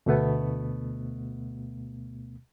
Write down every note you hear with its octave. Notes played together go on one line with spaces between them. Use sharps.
D2 B2 A3 B3